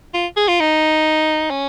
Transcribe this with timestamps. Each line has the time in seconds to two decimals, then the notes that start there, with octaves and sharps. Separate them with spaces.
0.14 F4
0.37 G#4
0.48 F4
0.60 D#4
1.51 C#4